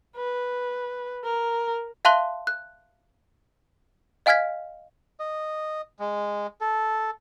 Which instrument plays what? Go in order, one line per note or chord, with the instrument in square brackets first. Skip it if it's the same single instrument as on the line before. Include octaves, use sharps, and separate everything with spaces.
[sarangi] B4
A#4
[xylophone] E5 F5 A5 C6 F#6 G7
F#6
D#5 F5 G#5 F6 G#6 B6
[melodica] D#5
G#3
A4